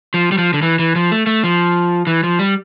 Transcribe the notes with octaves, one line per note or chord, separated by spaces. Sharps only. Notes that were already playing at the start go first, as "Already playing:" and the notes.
F3
G3
F3
D3
E3
E3
F3
A3
A3
F3
E3
F3
G3